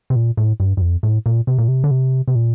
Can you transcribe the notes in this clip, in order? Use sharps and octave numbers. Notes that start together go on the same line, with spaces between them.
C3
A#2
A2
G2
G2
F2
A2
A#2
C3
A#2
C3
D3
C3
C3
A#2